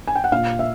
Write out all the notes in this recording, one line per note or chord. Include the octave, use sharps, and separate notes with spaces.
G#5
G5
F#5
A#2 F5
E5